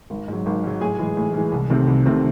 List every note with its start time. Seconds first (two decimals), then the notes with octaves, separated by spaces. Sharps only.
0.10 G#1
0.28 G#2 F#3
0.46 G#1
0.64 G#2 F#3
0.81 A2 G#4 G#5
0.99 E3 G#3
1.17 A2
1.34 E3 G#3
1.52 C2
1.70 C3 D#3 A3 C4
1.87 C2
2.06 C3 D#3 A3 C4